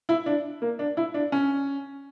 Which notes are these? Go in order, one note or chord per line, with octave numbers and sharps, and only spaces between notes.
E4
D4
A#3
D4
E4
D4
C#4